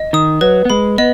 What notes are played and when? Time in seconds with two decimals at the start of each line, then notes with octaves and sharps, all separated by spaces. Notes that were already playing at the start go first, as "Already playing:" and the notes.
Already playing: D#5
0.13 D#3 D#6
0.41 F#3 B4
0.65 B3
0.70 G#3 B5
0.98 B3 D#5